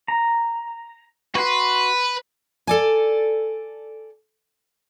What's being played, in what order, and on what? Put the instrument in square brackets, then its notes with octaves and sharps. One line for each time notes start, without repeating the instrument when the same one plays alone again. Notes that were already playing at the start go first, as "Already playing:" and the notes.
[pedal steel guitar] A#5
[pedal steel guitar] F#4 C6 [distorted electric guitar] B4
[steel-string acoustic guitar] A4 D5 G#5